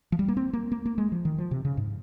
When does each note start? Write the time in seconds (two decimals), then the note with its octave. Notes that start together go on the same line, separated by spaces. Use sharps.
0.12 F3
0.19 G3
0.28 A#3
0.37 C4
0.53 A#3
0.72 A#3
0.86 A#3
0.98 G#3
1.12 F3
1.25 D#3
1.38 F3
1.51 C3
1.65 C#3
1.77 G#2